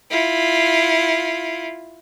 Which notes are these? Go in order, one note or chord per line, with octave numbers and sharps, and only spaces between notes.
E4 F4